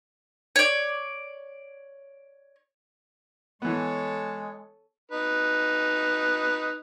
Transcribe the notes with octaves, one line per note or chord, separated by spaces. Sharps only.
C#5 D5
E3 G#3 B3 A4 C#5
D#4 B4